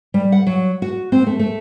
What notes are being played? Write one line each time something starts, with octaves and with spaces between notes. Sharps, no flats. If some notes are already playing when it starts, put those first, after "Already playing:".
G3
F#5
F#3
F#4
C4
A3
A3